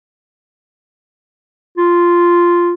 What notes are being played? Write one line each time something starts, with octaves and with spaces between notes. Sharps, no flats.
F4